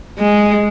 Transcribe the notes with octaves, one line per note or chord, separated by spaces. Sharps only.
G#3